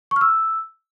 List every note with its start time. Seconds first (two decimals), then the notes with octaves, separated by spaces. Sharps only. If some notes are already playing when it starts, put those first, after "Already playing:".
0.11 C#6
0.16 F6
0.21 E6